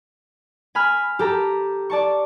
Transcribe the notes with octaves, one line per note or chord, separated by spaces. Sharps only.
G#5 B5 F6
G4 A4 A#5
D5 A5 C#6